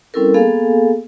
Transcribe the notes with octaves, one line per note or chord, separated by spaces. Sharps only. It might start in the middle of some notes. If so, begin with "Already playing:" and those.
G3 C4 C#4 E4 A4 A#4
A#3 B3 G#4 A4 F5 G#5